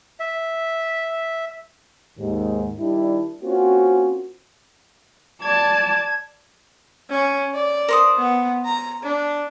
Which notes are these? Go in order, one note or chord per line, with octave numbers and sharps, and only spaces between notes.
E5
D#2 G#2
D#3 G3 D4 E4
A#3 C4 C#4 F4 F#4
D5 A5 G#6
C#4
D5
A#4 C5 D#6
B3
A#5
D4